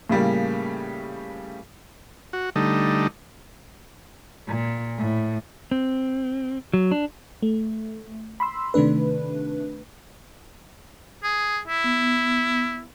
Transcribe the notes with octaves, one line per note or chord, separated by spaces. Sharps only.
A2 C#3 G3 A#3
F#4
D3 G3 A3 D#4
A#2
A2
C4
F#3
D4
A3
B5 C6 E6
C3 D#3 A3 D4 B4
G#4
E4
B3